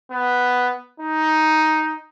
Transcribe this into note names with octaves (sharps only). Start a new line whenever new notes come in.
B3
D#4